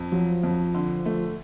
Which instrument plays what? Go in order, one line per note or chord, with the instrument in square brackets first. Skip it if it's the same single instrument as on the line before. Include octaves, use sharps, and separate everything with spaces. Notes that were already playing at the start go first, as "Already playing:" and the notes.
Already playing: [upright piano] F2
[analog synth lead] F3 [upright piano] F#3
[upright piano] F2
D3
A3